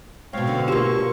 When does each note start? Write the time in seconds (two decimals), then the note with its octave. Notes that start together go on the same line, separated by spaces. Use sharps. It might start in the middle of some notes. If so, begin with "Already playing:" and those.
0.33 G#2 B2 C4 C#5 F5
0.47 D3
0.68 A#3 F4 G4 C6 C#6